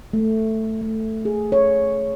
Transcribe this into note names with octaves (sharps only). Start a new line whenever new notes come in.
A3
A3
G#4
C#5